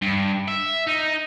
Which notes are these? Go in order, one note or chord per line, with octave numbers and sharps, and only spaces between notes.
G2
E5
D#4